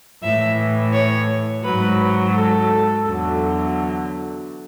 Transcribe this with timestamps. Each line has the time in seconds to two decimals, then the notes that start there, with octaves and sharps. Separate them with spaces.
0.23 A2 E3 E5
0.93 C#5
1.64 G#2 F#3 B4
2.34 A4
3.04 E2 D3 F#3